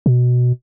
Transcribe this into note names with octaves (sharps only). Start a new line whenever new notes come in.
B2